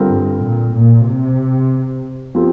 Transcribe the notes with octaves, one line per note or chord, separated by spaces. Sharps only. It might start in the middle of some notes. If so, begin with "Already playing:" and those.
Already playing: D3 G3 C4 F4 A#4
G2
A#2
A#2
C3
F3 C4 G4